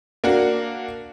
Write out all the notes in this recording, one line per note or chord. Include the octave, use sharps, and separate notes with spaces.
A#3 D4 F#4